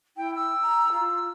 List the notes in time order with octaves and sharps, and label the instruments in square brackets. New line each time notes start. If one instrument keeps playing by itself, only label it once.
[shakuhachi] E4 [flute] G5
[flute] E6
[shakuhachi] A#5
F4